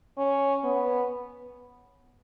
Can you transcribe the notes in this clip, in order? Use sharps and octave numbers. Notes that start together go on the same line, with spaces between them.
C#4
B3